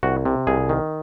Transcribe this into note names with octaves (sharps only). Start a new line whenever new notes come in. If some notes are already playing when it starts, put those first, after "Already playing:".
C2 F#4
C3
C2 G#4
D#3